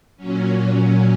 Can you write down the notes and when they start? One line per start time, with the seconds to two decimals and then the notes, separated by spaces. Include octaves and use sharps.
0.17 A#2 F#3 C#4
0.80 C#4